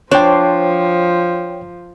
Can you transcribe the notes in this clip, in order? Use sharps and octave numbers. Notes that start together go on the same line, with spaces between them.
F3 D4 C5 C#5 G5